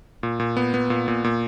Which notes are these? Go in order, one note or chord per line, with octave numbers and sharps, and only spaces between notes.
A#2
A#2
B3
B3
A#2
A#2
A#2